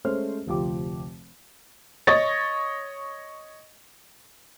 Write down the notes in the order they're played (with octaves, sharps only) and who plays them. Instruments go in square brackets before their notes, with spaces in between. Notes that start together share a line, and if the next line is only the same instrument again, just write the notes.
[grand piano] G#3 A3 C#4 C5 F6
F1 D2 F3 G4 D6
[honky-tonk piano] C#5 D#5 C#6 A6 A#6